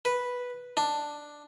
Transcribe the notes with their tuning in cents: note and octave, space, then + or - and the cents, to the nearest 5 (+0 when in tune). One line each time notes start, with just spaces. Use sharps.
B4 -5
D4 +5